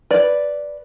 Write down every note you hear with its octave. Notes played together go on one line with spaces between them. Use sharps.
B4 D5